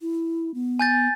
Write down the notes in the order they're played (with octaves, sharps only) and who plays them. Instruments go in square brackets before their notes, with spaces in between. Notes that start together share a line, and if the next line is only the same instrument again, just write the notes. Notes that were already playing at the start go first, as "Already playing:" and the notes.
[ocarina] E4
B3
[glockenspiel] G#5 G6 A6